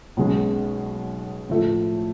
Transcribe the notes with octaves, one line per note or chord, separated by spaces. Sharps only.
B1 B2 G#3 C#4
A2 F3 A3